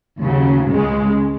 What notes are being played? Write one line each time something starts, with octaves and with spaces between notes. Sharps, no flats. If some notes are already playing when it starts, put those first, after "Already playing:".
D#2 C#3 F#3
C#2 C#3 G#3